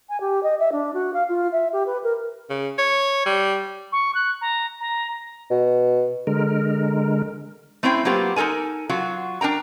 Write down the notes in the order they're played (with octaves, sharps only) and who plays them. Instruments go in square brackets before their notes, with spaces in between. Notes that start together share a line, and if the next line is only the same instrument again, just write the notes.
[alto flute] G#5
G4
D#5
E5
D4
F#4
F5
F4
E5
G4
B4
A#4
[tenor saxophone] C#3
C#5
G3
[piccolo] C#6
F#6
A#5
A#5
[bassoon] B2
[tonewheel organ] D3 G#3 A#4
[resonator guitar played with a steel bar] A3 C4 C#4 E4 C5 G5
F#3 A#3 B3 F4 G4 C5
D#4 F4 A4 A#4 G#5
F#3 F4 F#4
D4 A#4 G5 A#5